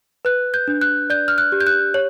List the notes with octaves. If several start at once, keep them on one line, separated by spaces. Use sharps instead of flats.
B4 F#6
G6
D4
F#6
D5 G6
F6
F#6
G4
G6
F#6
C#5